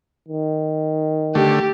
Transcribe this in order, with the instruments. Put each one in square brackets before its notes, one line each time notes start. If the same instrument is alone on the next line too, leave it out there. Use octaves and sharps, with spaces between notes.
[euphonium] D#3
[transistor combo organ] D3 A3 [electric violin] G4